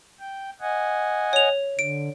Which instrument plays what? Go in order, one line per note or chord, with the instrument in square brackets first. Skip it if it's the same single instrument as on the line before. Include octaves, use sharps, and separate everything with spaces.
[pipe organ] G5
D#5 F#5 G#5
[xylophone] C#5 F7
[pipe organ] D3 [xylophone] D7